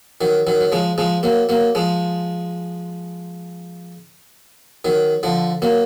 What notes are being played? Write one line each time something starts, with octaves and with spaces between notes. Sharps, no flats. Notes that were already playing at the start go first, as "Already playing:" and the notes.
D#3 F#3
D#3 F#3
F#3
F3 G#3
F3 G#3
F#3 A#3
F#3 A#3
F3 G#3
D#3 F#3
D3 F3
F#3 A#3